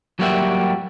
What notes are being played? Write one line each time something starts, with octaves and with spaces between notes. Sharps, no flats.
F#3 G3 A#3 F#4 G4 E5